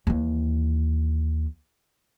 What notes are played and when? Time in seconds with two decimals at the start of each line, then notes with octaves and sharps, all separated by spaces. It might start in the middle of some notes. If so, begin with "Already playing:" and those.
0.07 D#2 E3